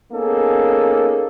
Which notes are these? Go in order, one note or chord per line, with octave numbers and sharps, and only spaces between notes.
A#3 B3 C#4 D#4 G#4 A4